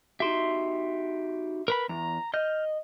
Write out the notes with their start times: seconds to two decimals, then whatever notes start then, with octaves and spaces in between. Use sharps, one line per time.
0.20 D#4 F#4 G4 E5 C6
1.68 A#4 B4 B5
1.89 E2 A#5
2.34 D#5 F6 G6